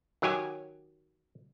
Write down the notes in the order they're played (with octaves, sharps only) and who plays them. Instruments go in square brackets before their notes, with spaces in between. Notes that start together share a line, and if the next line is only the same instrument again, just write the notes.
[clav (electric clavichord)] D#3 F#3 G4 G#5